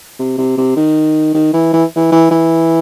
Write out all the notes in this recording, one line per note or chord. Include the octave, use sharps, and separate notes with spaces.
C3
C3
C3
D#3
D#3
E3
E3
E3
E3
E3